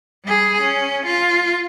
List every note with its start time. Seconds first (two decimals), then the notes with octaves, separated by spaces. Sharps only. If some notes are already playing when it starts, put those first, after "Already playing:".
0.25 G3 G#4
0.61 C#4
1.06 F4